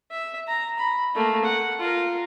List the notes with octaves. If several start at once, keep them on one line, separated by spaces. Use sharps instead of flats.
E5
A#5
B5
A3 A#3
F#5
F4 A#4